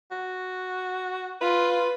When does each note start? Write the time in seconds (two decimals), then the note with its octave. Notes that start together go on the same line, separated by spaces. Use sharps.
0.11 F#4
1.41 F4 B4